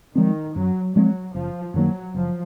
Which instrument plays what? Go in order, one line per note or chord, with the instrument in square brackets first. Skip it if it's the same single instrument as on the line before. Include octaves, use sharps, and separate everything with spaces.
[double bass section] D#3 [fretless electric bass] F3 G#3 C4
[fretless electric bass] F#2 [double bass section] F#3
[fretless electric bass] F3 G#3 C4 [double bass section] F#3
[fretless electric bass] F#1 [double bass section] F3
[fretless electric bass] F#2 D#3 A#3 [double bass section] F#3
[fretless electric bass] F#1 [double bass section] F3